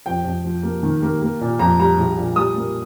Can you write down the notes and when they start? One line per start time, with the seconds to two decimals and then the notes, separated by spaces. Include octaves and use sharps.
0.06 F2 G5
0.25 F2
0.44 F3
0.63 A#3
0.83 D#3
1.02 A#3
1.22 A#3
1.41 A#2
1.59 F2 A#5
1.79 G3 A#5
1.98 A#1
2.17 A#2
2.36 G3 D#6
2.56 A#3